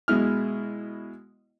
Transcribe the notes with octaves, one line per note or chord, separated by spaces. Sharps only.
B2 G#3 E4 F6